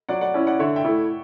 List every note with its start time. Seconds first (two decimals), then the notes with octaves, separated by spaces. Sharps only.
0.09 F#3 D5 F#5
0.21 D5 F#5
0.34 C#4 E4
0.46 D5 F#5
0.59 D3 C#5 E5
0.76 E5 G5
0.85 A3 E4